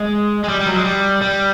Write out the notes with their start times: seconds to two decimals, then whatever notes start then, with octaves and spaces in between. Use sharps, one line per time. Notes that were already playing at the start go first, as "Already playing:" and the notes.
Already playing: G#3
0.44 G#3
0.48 G3
0.60 G3
0.67 F#3
0.76 G#3
0.85 G3
1.22 G3